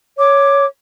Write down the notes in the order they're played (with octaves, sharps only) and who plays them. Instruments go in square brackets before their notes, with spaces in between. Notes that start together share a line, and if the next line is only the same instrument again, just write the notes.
[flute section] C#5 D6